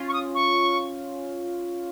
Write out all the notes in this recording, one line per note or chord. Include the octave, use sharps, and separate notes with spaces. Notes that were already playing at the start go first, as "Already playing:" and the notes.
Already playing: C#4 F4
C#6
D#6
C#6